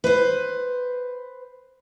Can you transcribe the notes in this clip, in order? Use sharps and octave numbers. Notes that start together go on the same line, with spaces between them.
B4 C5